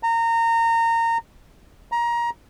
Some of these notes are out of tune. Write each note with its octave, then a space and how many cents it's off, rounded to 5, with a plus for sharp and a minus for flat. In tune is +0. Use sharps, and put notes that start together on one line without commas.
A#5 -25
A#5 +20